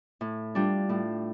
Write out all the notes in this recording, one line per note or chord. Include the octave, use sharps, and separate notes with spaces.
A2
G3 D4 F4
A2